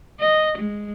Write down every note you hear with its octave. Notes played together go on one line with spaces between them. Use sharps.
D#5
G#3